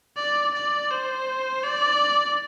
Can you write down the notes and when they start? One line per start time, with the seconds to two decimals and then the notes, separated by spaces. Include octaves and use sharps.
0.17 D5
0.54 D5
0.91 C5
1.64 D5